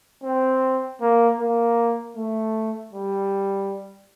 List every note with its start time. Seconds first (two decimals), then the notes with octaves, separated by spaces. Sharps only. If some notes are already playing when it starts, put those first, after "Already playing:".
0.23 C4
1.01 A#3
1.39 A#3
2.17 A3
2.93 G3